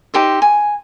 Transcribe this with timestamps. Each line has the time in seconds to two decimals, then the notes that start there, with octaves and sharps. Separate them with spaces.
0.14 D#4 G4 C5 E5
0.42 G#5